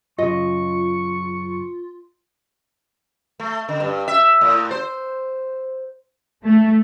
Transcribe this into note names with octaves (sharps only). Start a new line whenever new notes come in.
F#2 C#3 F4 D#5 C#6
A3
D3
G2
E5
A2
C5
A3